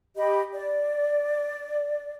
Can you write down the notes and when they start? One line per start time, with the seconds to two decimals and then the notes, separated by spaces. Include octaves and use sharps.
0.16 G4 D#5 B5
0.54 D5